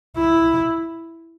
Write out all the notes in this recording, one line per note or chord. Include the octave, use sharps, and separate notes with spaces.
E4